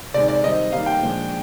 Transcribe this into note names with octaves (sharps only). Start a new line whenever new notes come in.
C3 D#3 G#3 D#4 D5
D5
D#3 G3 C4 D#5
D#3 G3 A#3 F5
G5
A#2 F3 G#3 D4